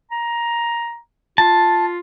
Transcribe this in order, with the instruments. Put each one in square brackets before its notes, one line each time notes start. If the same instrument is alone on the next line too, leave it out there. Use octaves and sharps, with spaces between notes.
[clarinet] A#5
[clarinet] F4 [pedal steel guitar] A5